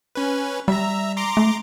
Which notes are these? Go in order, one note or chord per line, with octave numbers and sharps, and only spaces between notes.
C#4 B4
G3 E5 A#5
A#5 C6 D6
A3